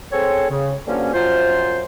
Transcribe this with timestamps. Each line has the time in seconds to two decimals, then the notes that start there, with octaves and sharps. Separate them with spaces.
0.12 C4 G#4 A4 C#5
0.50 C#3
0.87 G2 D3 F3 F#3 A#3 C#4
1.14 F#2 F3 F4 C5